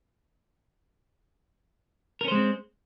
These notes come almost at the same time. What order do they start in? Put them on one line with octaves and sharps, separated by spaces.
A#4 C#4 C5 G#3 C4